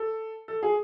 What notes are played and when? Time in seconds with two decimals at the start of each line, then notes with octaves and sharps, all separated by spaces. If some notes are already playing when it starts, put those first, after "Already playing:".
Already playing: A4
0.48 A4
0.63 G#4